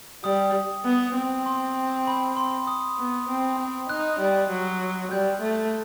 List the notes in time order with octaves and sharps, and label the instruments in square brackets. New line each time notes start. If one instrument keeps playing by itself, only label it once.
[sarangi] G3 [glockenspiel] D#6
[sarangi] B3
C4
[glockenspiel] C6
B5
C6
D#6
[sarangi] B3
C4
C4
[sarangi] D#4 [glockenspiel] F#6
[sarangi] G3
F#3
[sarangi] G3 [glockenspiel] G6
[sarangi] A3